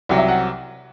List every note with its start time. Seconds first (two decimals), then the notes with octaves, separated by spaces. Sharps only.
0.09 C2 C3 F#3
0.18 E5
0.28 F#5